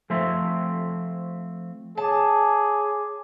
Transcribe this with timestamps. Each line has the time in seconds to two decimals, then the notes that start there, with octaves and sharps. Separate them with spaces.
0.10 F3 A3 C4 C5 E5
1.98 G#4 C#5 A5 D6